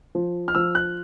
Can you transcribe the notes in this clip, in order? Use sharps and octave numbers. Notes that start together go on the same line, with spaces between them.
F3
F6
F3 E6
F#6